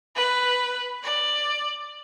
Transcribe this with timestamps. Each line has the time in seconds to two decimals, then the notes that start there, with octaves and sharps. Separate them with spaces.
0.16 B4
1.04 D5